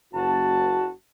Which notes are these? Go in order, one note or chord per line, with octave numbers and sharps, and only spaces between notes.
F#1 F#4 A5